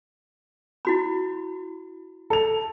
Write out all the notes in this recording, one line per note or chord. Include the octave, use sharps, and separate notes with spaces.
E4 F#4 B5
A4 F7